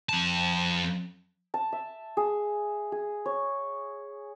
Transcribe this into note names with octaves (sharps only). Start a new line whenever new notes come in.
F2 A5
A5
E5
G#4
G#4
C#5